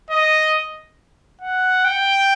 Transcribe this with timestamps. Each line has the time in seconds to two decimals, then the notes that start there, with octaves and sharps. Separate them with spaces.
0.10 D#5
1.41 F#5
1.85 G5